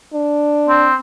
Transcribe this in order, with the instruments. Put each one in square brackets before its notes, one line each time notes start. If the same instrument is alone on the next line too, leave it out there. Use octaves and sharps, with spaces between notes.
[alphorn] D4
[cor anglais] C4